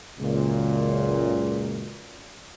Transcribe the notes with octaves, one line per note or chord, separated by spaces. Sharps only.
C#2 F#2 A#2